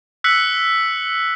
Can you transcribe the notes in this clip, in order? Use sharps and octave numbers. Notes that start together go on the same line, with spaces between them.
E6 F#6 B6 C#7 F#7